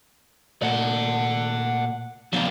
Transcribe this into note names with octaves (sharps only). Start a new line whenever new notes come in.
A#2 A3 F#4 D5 F#5
F3 F#3 A#3 B3 D4